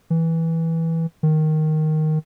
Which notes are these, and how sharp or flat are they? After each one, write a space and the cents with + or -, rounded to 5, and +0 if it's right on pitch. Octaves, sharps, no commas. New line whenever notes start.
E3 -10
D#3 +0